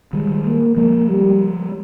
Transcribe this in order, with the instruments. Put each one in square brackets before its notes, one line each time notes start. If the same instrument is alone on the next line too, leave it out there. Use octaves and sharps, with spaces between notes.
[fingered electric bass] D#3 G3 [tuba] G#3
[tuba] A#3
[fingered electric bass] F3 G#3 [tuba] A#3
[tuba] G3